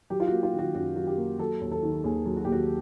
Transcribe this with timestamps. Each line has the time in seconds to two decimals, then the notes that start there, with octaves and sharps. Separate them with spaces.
0.10 F#3 G4
0.20 F4
0.27 A#3 F#4
0.43 F4
0.53 D#3
0.59 F#4
0.75 F#2 F#4
0.96 F#3 F#4
1.07 G4
1.17 A#3
1.39 F#3 A4
1.61 D#2
1.72 A4
1.83 D#3
2.04 D#2 G#4
2.25 F#3
2.36 F#4
2.45 D#2 G4
2.52 F#4